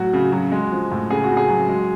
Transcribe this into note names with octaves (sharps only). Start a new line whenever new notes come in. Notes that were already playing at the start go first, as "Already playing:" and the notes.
Already playing: A2 F#3 F#4
C#3
F#3
G#3
F3
A2
C#3 G#4
F#4
C#3
G#4
F#3
G#3